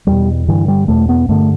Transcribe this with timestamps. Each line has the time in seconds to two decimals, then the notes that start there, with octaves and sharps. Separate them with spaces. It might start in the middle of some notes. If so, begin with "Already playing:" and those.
0.07 E2 B2 G3
0.48 G2 D3 E3
0.68 G3
0.88 E2 B2 A3
1.09 B3
1.29 G2 D3 A3